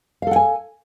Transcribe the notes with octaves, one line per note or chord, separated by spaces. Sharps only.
A4 F5 F#5 G#5